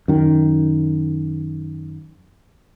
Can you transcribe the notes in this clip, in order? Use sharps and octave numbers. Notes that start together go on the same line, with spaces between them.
F#2 D#3